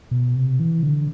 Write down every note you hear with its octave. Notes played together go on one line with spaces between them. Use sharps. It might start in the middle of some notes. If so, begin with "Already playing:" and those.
B2
C3
E3
D3